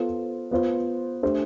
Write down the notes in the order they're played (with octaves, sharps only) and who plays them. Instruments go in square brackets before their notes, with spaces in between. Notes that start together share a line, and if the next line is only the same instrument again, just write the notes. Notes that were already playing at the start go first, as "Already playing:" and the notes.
Already playing: [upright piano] B3 F4 A4 C5
B3 F4 C5
A3 D4 G4 C5